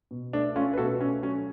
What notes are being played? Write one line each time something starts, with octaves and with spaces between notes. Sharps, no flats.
B2
A3 D4
A3 C#4 F4
B4
B2 F#4 A4
A3 C#4
F#3 C#4